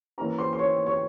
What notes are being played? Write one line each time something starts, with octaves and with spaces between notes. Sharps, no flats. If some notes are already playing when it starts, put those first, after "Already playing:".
E3 A#3 C#4 A#4 A#5
C5 C6
C6
C#5 C#6
C#5 C#6